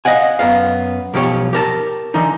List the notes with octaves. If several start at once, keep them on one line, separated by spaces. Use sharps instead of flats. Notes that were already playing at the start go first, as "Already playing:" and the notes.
D#5 F5 F#5 G#5
F#2 B3 F5
B1 F3 G4 C#5
G4 A#4 A5
D3 E3 D#4